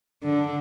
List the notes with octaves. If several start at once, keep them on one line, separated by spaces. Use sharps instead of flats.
D3